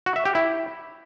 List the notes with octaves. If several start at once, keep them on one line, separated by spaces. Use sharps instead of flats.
F#4
E5
G4
E4